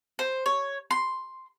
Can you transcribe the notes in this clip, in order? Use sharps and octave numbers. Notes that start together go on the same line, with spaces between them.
C5
C#5
C6